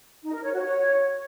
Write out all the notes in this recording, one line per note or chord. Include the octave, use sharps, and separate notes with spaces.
D#4
A#4
C#5
F#4
C#5